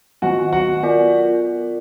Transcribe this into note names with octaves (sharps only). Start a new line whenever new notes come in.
D#3 F#3 B3 F#4 F#5
F#4 F#5
B3 F4 A#4 D5